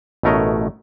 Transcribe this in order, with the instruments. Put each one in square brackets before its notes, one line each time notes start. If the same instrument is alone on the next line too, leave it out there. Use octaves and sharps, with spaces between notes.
[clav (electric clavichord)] A1 B2 A3 A#4 C#5 D#5